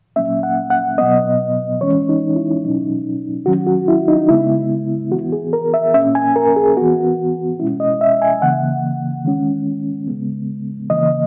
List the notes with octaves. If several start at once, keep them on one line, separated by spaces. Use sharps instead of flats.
A#2 F#3 A#3 C#4 E5
F#5
F#5
B2 F#3 B3 D#5
E3 G#3 C#4 C#5
D#4
E4
B2 F#3 C#4 D#4
D#3 F#3 C#4 F#4
F#4
E4
D#4
C#3 G#3 B3 E4
E3 B3 F#4
G#4
A#4
E5
A#2 A#3 C#4 E5
G#5
A#4
G#4
E3 B3 F#4
B2 G#3 C#4 E4
D#5
E5
G#5
C#3 E3 A#3 F#5
D#3 G#3 C#4
C#3 G#3 B3
C#3 E3 A#3 D#5